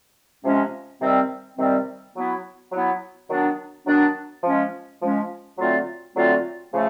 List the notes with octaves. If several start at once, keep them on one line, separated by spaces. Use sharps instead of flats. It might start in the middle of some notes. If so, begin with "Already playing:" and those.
C3 F3 G#3 C#4
C3 D#3 G3 C4
C3 D#3 G3 C4
F#3 B3 E4
F#3 B3 E4
D#3 F#3 B3 D4
D#3 F#3 B3 D4
F3 G#3 C#4
F3 G#3 C#4
D3 F#3 A3 C4 F4
D3 F#3 A3 C4 F4
C#3 F3 A3